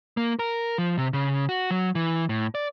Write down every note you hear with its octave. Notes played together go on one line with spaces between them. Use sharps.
A#3
A#4
F3
C3
C#3
F#4
F#3
E3
A2
D5